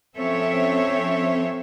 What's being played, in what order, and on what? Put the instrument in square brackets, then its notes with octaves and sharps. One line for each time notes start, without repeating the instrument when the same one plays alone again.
[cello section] F3 C4 C#4 A4 C#5 E5